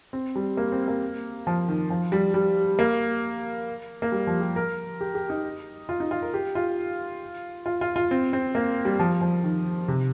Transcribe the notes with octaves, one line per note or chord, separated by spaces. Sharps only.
C4
G3
A#3
C4
A#3
F3
D#3
F3
G3
G3
A#3
A#3
G3
F3
G4
A#4
G4
G4
D#4
F4
D#4
F4
A#4
G4
F4
F4
F4
F4
C4
C4
A#3
G3
F3
F3
D#3
C3